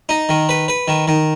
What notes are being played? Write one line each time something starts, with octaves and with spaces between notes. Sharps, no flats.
D#4
D#3
B4
B4
D#3
D#3